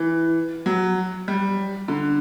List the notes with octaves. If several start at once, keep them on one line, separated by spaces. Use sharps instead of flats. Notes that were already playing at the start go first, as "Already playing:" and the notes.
Already playing: E3
F#3
G3
D3